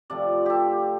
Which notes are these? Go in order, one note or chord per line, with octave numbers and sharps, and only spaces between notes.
C3 F3 A3 D5
G4 A4